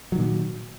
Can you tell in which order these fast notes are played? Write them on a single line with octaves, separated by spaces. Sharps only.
F#3 D#3 A#2